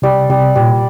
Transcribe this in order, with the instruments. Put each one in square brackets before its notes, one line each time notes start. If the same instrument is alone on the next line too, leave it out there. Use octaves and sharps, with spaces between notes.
[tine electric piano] C3 [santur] G3
[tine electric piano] C3 [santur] G3
[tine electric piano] A#2 [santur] G3